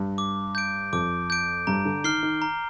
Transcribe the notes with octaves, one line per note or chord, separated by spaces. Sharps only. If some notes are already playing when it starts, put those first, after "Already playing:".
Already playing: G2
D6
G6 D7
F2 D6
G6 D7
G2 A#5
D3
D#3 F6 C7 G7
D#3
A#5